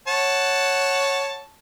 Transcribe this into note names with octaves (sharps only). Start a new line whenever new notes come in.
C#5 F#5 A5